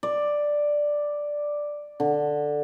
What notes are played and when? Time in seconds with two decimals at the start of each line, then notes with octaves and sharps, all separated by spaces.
0.03 D5
2.00 D3